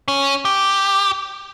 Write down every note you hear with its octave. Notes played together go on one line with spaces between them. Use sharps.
C#4
G4